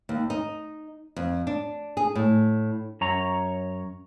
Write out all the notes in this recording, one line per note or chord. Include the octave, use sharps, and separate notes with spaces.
D#2
D#4
F2
D4
G#4
A2
F#2 C#5 A#5